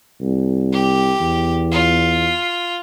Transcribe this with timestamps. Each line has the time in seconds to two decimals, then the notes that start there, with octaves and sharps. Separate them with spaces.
0.21 C2
0.72 G4
1.20 E2
1.72 F4